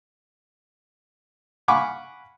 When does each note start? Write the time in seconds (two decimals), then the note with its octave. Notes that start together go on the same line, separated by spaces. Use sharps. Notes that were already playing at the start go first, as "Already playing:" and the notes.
1.68 F5 F#5 G#5 B5 C#6 D6